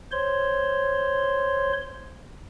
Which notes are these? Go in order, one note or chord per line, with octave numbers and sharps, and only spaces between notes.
C5 C#5 C6